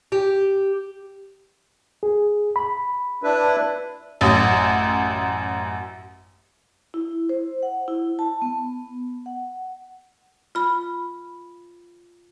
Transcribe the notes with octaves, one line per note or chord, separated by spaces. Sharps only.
G4
G#4
B5
D4 E4 B4
A1 F#2 D#6
E4
C5
F#5
E4
A5
B3
F#5
F4 B5